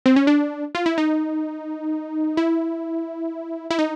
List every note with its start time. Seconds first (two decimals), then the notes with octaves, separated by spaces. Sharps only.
0.06 C4
0.16 C#4
0.27 D4
0.75 F4
0.86 E4
0.98 D#4
2.37 E4
3.70 E4
3.79 D#4